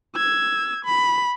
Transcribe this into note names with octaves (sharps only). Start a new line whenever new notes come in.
E6 G#6
B5